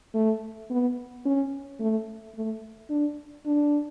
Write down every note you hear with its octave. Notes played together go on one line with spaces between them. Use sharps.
A3
B3
C#4
A3
A3
D4
D4